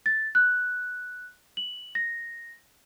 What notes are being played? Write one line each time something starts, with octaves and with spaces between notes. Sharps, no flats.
A6
F#6
F#7
A#6